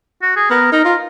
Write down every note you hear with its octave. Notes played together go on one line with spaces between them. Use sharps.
F#4
G#4
B3 A#4
D#4 A#4
F4